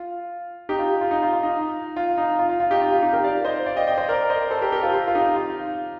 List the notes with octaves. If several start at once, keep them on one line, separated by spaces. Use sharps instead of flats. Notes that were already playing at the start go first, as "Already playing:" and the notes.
Already playing: F4
D#4 G4
F4
F4
D#4
F4
F4
D#4
F4
D#4
F4
F4
F4
D#4 G4
F4
F4
D#4 G4
G4 A#4
D5 F5
C5 D#5
D5 F5
D#5 G5
D#5 G5
C5 D#5
A#4 D5
C5 D#5
A4 C5
G4 A#4
G4 A#4
F4 A4
F4
F4
D#4 G4
F4